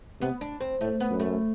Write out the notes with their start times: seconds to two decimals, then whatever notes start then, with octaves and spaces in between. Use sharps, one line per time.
0.21 C3 B3
0.41 D4
0.61 C4
0.81 A2 A3
1.00 B3
1.11 F#2
1.20 A3